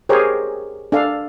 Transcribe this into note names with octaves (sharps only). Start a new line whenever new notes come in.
G4 G#4 A#4 C5 C#5
D4 A4 F5